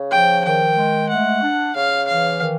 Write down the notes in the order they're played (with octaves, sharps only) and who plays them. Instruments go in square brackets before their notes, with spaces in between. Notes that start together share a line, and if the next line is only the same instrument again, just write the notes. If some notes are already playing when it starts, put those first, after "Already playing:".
Already playing: [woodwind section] C#3
[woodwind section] F3 [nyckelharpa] G5
[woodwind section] D#3 [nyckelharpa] G5
[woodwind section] G#3
[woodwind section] A3 [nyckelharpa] F#5
[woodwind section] D4
[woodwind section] C#3 [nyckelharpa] F5
[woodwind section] E3 [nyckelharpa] F5
[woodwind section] D#3